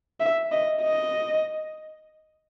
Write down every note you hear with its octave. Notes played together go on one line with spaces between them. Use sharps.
E5
D#5
D#5